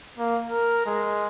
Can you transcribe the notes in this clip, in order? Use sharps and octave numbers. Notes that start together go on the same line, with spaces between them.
A#3
A#4
G#3